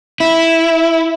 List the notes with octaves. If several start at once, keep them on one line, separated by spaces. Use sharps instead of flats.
E4